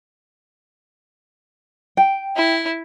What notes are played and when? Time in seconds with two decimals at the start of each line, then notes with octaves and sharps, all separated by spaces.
1.97 G5
2.36 E4